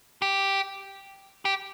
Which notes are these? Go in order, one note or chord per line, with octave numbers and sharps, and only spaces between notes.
G4
G4